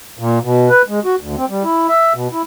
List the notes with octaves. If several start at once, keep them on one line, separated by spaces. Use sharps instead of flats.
A#2
B2
B4
G#3
F#4
D2
C4
G3
E4
E5
B2
E4